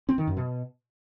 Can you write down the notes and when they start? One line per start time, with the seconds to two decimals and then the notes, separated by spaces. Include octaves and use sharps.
0.09 C4
0.18 D#3
0.27 F#2
0.37 B2